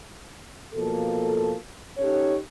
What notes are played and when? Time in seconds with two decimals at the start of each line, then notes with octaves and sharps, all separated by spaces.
0.74 B2 F3 A#3 A4
1.98 C#4 D#4 G4 A4 C#5